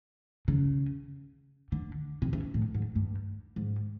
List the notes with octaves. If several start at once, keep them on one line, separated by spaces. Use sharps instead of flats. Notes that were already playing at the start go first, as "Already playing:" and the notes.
C#3
D3
C3
C#3
A2
G#2
G2
G#2